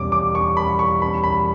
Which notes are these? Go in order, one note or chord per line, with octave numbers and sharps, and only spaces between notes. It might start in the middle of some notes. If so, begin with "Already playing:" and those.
Already playing: E2 B2 G3 C#4 D6
D6
C#6
B5
C#6
B5
B5